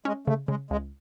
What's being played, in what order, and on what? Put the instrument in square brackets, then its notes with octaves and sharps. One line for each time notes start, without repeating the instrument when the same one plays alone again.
[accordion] G#3 [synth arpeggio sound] C#4
[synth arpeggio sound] C#3 [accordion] A3
[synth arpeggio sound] C#3 [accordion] G#3
[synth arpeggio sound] C#2 [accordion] G#3